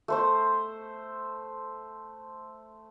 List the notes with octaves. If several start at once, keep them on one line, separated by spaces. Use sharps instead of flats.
A3 C5 C6